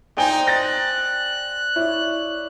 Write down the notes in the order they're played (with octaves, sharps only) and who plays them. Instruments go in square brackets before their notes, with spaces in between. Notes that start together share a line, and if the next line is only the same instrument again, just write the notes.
[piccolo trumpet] D#4 [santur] C5 D5 [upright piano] G5 G#5 G7
[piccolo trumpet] F#6 [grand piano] A6 A#6
[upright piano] E4 [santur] C#5 D5